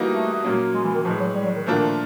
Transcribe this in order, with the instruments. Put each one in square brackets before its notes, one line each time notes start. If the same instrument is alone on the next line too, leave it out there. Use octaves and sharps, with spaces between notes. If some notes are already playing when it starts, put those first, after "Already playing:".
Already playing: [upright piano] E3 G3 A#3 D#4 F#4
[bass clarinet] A3
[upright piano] A#2 F#3 A#3 C#4 F4
[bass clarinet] G#3
E3
D#3
[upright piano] A2 E3 G#3 [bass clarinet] F3
[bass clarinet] F#3
G3
F#3
D#3
[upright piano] A#2 F3 A3 D4 F4 [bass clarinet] D#3